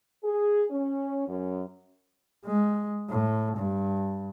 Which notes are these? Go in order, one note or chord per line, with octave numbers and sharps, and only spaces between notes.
G#4
C#4
F#2
G#3
A2
G2